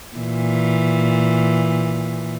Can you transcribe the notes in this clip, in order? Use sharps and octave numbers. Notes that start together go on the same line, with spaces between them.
A#2 E3